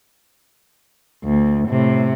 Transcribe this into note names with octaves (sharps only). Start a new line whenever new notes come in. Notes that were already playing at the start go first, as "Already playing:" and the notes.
D2
A2 C3